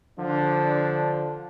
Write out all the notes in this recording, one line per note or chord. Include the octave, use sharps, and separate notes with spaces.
D3 F3 D4